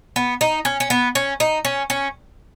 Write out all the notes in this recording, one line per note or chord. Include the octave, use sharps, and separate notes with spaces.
B3
D#4
C#4
C#4
B3
C#4
D#4
C#4
C#4